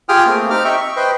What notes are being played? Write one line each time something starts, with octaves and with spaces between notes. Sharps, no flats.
F4 G4 G#4 G5 D#6 F6
A3 A#3 C4
C4 D#4 G4 D6 F6
D#5 E5 G5 C#6
C#6
B4 C5 D#5 G5